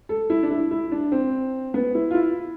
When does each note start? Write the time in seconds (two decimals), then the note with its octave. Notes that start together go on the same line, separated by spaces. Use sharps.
0.09 A4
0.30 E4
0.43 D4
0.50 E4
0.71 E4
0.91 D4
1.12 C4
1.74 B3
1.95 E4
2.11 F4
2.15 E4